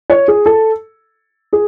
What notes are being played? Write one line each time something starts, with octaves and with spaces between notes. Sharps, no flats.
C#5
G#4
A4
G#4